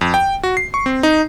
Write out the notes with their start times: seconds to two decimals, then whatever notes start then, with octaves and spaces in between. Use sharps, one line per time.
0.01 F2
0.14 G5
0.43 F#4
0.57 C7
0.74 C#6
0.86 C4
1.03 D#4